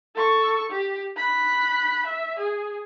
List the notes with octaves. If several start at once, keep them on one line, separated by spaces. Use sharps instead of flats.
A4 C#6
G4
B5 F#6
E5
G#4